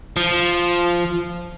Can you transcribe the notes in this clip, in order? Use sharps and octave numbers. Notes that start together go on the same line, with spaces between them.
F3